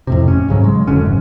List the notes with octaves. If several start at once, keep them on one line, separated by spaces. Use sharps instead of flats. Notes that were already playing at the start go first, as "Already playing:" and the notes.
F2 A2 C3
C#4
G#2 C#3 F#3
G#3
F1 D3 F#3 C#4
G#1